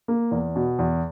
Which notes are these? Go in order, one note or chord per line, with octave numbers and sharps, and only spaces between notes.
A#3
E2
B2
E2